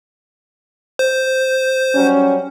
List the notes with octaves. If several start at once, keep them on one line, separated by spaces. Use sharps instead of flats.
C5
F#3 G3 C#4